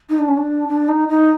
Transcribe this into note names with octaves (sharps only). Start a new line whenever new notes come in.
D#4
D4
C#4
D4
D4
D#4
D#4